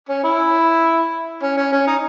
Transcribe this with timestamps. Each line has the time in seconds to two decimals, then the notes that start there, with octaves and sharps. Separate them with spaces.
0.09 C#4
0.24 E4
1.43 C#4
1.57 C#4
1.72 C#4
1.87 D#4